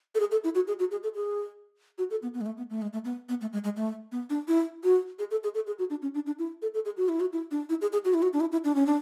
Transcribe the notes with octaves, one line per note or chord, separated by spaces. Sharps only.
A4
G#4
A4
E4
F#4
G#4
F#4
G#4
A4
G#4
F#4
A4
B3
B3
G#3
A3
B3
A3
G#3
A3
B3
B3
A3
G#3
G#3
A3
B3
D4
E4
F#4
G#4
A4
G#4
A4
G#4
F#4
D4
C#4
D4
D4
E4
A4
A4
G#4
F#4
E4
F#4
E4
D4
E4
G#4
G#4
F#4
E4
F#4
D4
E4
E4
D4
C#4
D4